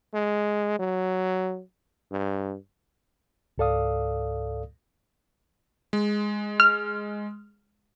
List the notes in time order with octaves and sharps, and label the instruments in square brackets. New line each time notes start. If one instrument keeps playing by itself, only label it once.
[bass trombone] G#3
F#3
G2
[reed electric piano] C#2 G#2 A4 D5 F5 D#6
[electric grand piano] G#3
[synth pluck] F6